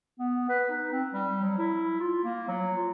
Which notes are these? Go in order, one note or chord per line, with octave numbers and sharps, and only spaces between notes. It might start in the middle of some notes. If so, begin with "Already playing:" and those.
B3
B4
D#4
C4
G3
F#3
E4
F4
A#3
F#3
F4